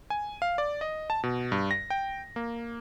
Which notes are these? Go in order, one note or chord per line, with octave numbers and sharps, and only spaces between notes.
G#5
F5
D5
D#5
A5
B2
G2
A#6
G5
A#3